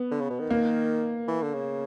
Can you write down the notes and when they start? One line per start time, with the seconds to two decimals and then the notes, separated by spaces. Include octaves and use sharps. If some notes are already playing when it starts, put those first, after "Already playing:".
Already playing: B3
0.11 D3
0.21 C#3
0.30 B2
0.40 D#3
0.50 A#3
1.28 E3
1.42 D3
1.54 C#3